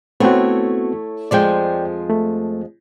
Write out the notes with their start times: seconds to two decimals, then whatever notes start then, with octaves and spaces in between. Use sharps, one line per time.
0.20 A3 B3 C4 E4 F#4 C#5
1.31 F2 F3 G#3 D5 G5
2.10 A3